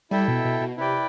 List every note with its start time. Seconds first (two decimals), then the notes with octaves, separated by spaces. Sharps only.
0.11 G3 E4 A4 E5 G5
0.28 B2
0.45 B2
0.61 B2
0.77 C3 E4 B4 D5 G5